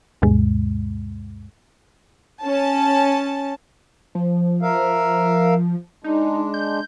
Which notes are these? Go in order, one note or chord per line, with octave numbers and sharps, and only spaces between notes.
D2 G2 B2 G#3
C#4 A5
F3
A#4 E5 F5
G#3 D4 D#4
G6